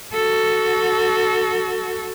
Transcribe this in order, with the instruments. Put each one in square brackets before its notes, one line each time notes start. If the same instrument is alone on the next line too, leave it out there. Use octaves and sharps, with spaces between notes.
[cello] F#4 A4